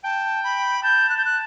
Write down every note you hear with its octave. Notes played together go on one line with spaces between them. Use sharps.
G5 A5
B5
A5 G6
F#6
G6
F#6